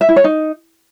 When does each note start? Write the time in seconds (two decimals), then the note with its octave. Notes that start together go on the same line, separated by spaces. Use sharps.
0.01 E5
0.09 E4
0.16 C#5
0.24 D#4